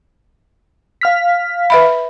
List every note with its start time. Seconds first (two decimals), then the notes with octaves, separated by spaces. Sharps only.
1.01 F5 F6 B6
1.70 B4 E5 B5